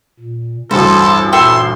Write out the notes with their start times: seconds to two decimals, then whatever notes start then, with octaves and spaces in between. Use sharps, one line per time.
0.19 A#2
0.71 A1 D2 G2 A4 C5 C6
1.33 A#2 A4 E5 G5 C6